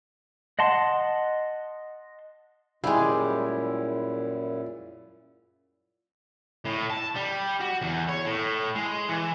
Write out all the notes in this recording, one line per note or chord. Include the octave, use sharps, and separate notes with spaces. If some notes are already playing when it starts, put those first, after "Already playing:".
D#5 F#5 A5 C6
F#2 A#2 G3 G#3 E4
A2
A5
G3
F#4
E2
C#5
A2
G#3
E3